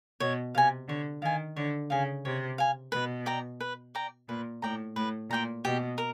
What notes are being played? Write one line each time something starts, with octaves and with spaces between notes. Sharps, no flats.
B2 C#5
C3 F5 G#5
D3 C#5
D#3 F5 G#5
D3 C#5
C#3 F5 G#5
C3 C#5
F5 G#5
B2 B4
D5 G5 A#5
B4
D5 G5 A#5
A#2 B4
A2 D5 G5 A#5
A2 B4
A#2 D5 G5 A#5
B2 G4
A#4